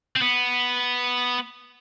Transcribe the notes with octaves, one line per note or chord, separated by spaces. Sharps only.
C4
B3